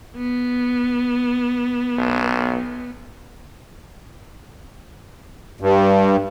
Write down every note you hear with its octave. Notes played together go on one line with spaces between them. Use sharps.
B3
B1
G2